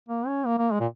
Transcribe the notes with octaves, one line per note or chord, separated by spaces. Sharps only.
A#3
C#4
A#3
A#3
G#3
A#2